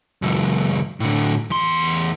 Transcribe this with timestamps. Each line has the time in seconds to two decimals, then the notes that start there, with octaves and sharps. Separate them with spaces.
0.22 C#2 F#2
1.00 A2 D3
1.50 E2 C6